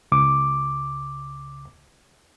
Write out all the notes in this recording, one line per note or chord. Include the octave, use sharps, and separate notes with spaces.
C#2 D6